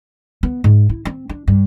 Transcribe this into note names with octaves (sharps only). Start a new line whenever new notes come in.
B3
G#2
E4
C4
D4
G2